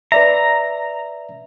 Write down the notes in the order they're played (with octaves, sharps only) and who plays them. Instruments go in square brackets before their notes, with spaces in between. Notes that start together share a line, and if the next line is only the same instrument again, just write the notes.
[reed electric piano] B4 D5 E5 [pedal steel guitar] A#5